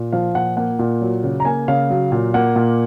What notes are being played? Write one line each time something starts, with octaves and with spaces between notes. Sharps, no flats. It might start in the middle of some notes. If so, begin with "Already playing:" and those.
Already playing: A#2
F3 F5
A#2 F#5
A#3 F#5
A#2
F#3
C#3
A#5
A#3 G#5
C#3 F5
F#3
A#2
A#3 F#5
A#2